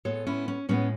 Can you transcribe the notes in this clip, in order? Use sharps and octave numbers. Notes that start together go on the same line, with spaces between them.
A2 G#3 B3 A4 C#5
C#4 E4
C#4
A2 G#3 B3 C#4